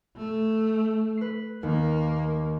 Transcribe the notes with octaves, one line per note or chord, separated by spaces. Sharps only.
A3
B4 C7
D#2 A#3